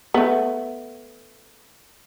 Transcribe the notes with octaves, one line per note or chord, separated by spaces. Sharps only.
A3 B3